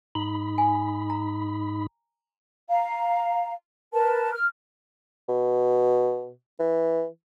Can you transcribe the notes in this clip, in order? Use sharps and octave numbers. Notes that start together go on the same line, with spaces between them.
G#2 D#4 B5
G#5
A#5
F5 A#5
A#4 B4 A5
F6
B2
E3